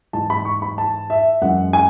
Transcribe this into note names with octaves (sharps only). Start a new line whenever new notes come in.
G#2 E3 G#3 A5
B5
C#6
B5
A5
E5
F#2 E3 G#3 F#5
G#5